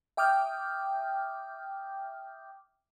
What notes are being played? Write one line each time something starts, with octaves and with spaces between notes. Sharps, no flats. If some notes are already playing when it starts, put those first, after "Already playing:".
E5 G5 D6 D#6 F6 G6